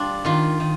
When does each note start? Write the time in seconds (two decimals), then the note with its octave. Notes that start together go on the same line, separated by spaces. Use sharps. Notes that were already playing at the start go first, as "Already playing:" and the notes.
Already playing: G3 D4 F4
0.25 D#3 F4
0.60 D#3